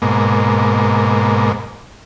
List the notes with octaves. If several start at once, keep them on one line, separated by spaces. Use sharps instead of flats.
G#2 B2 A#3